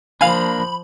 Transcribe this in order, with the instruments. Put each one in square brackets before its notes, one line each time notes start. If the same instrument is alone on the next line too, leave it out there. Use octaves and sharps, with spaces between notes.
[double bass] F3 [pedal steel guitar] A#3 D4 [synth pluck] F5 G#5 [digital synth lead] B5